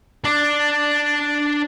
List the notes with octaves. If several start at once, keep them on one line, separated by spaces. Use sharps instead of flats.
D4 D5